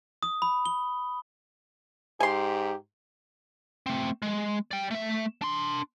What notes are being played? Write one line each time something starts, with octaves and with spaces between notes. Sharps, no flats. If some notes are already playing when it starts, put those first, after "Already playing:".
D#6
B5
G7
G#2 G4 G#5 C6
A3 C4
G#3
D5 G5
A3 E5
D4 C6